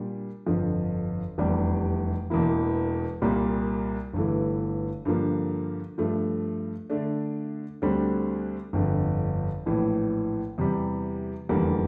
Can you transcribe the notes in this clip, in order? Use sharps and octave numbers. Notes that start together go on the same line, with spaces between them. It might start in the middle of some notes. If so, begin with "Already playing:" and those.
Already playing: A#2 G3 D4
G1 F2 D3 F3
F1 E2 C3 G3 D4
E1 E2 E3 A#3 E4
C2 A#2 G3 A#3
G1 G2 E3 A3
G2 D3 F3 A#3
G2 F3 A3
D3 A3 D4
D2 D3 G3 C4
G1 F2 D3
A#1 A2 E3
E2 C3 G3
F1 E2 D3 G3 A#3